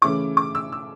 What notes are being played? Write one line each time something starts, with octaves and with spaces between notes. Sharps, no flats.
C#3 E3 A3 C#4 E4 D6
D6
E6
E6